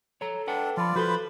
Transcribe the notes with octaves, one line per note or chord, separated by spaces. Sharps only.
A4 C#5 A#5
D4 B4 F#5 G5
F3 F4 D5 A5 B5
F3 F4 F#4 A4 B4 C5 B5 G7